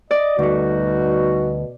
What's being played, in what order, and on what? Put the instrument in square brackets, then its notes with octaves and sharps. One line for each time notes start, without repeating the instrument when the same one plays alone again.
[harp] D5 [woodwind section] D#5
[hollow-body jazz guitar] D2 A3 [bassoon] B2 [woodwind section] G3 D#4 F#4